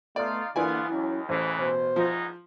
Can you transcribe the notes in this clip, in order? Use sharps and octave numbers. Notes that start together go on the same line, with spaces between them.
A3 B3 D#4 F4 D5
C2 D3 E3 A#3 B3 F4 D5 G#5
D#2 F#3 C#4 E4
A1 D#2 C#3 E3 C5
B2 C5
E2 G#2 F3 D#4